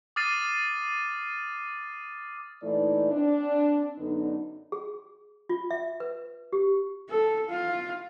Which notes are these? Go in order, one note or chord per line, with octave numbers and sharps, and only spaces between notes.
D6 D#6 F6 A6 C7 D#7
A#2 E3 A3 D#4 D5
C4 D4
F#2 D3 B3 D4 D#4
G#4
F4
E5
B4
G4
A4
F4